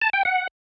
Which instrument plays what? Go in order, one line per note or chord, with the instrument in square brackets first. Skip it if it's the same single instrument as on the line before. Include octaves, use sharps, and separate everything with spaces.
[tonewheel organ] A5
G5
F#5